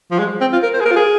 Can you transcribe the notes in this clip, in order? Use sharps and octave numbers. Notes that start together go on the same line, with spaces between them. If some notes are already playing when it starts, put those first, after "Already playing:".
F3
G#3
C4
F4
A#4
C5
G#4
A#4
F4
G#4